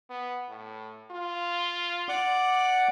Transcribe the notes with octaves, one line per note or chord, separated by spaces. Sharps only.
B3
A2
F4
D5 F#5 D6